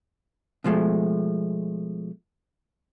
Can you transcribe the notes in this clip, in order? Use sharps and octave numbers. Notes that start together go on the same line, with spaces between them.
B2 F3 G#3 A3